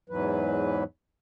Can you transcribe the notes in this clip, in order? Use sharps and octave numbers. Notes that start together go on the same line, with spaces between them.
E2 G#2 E3 F#3 B4